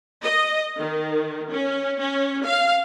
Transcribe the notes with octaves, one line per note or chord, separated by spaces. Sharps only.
D#5
D#3
C#4
C#4
F5